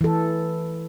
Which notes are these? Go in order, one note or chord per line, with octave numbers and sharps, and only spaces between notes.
E3 A4